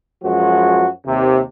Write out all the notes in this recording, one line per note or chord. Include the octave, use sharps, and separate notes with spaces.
F#2 F3 G#3 F#4
D#2 C3